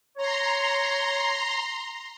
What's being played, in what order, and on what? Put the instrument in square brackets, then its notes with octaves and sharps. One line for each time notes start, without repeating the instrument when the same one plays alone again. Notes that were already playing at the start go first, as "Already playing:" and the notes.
[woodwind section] C#5 [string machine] A#5 C6